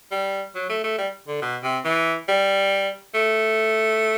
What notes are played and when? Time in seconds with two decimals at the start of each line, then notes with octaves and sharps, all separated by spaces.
0.12 G3
0.55 F#3
0.70 A3
0.84 A3
0.98 G3
1.28 D3
1.42 B2
1.63 C3
1.85 E3
2.29 G3
3.15 A3